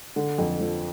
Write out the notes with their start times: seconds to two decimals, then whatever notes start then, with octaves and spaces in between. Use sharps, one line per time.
0.16 D3
0.38 F2
0.60 F3